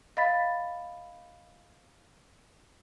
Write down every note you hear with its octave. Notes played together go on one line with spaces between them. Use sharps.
D#5 F5 B5 A6 B6